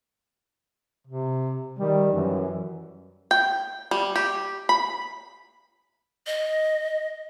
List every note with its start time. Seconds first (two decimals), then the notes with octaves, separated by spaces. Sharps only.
1.07 C3
1.78 D#3 G3
2.13 F#2 E3
3.31 G5
3.91 G3
4.16 G4
4.69 B5
6.26 D#5